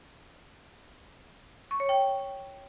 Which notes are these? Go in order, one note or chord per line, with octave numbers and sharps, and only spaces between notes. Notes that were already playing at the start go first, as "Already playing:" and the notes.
C#6
C#5
G5